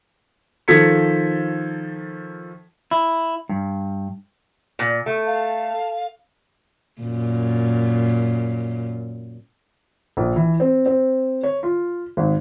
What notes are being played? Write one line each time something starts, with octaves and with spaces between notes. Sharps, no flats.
D#3 F3 A4 G#6 B6 C#7
E4
G2
A#2
A3
F5 A5
F#2 A#2
A#1
E3
C4
C4
C#5
F4
G#1